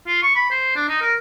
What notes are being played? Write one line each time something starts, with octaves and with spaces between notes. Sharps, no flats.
F4
C#6
B5
C5
D4
D#4
A#4